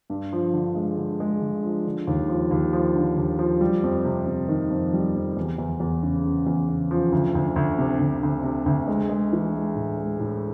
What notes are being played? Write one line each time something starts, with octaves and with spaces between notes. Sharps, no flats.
G2
F3
D3
G#3
D3
G#3
D3
F3
D3
D#2
F3
D#2
F3
D3
D#2
F3
G3
F2
C3
C3
D#3
F2
G3
F2
E2
E2
E2
C#3
C#3
E2
C#3
F3
D2
D2
D2
C3
D2
D2
C3
D2
G#3
G#3
E3
G#3
A2
G#3
A2